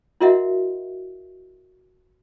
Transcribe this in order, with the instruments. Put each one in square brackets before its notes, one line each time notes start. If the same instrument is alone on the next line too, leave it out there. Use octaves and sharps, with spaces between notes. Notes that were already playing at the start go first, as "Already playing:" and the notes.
[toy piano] E4 F#4 A#4 D#5 E5 F#5